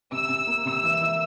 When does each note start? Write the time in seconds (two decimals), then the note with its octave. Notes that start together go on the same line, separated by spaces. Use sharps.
0.12 C3 E6
0.29 C3
0.47 A#3
0.66 C3 E6
0.83 E3
1.01 E3